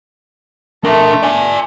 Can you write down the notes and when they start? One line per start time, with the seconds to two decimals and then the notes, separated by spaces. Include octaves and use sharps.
0.85 A3 D4 A#4
1.23 D5 G#5